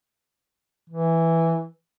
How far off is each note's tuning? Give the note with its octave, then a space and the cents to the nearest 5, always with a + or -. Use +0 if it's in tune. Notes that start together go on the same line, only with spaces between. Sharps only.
E3 +0